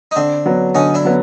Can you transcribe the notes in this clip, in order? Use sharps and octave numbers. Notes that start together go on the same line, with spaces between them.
D#4
D3 C4 D4
F#3 B3
D3 C#4 D#4
D4 E4
F#3 B3